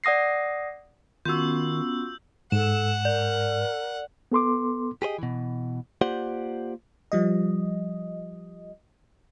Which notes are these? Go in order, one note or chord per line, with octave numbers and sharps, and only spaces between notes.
D5 F#5 D#6 A#6 C7
D#3 B3 C#4 F4 F#4 E6 G6
G#2 A4 F#5 E7
A#4 D5
B3 A4 C6 D6
G4 G#4 C5 D#5
B2 E3
A#3 F4 G4 C5 D5 F#5
F3 G3 D#5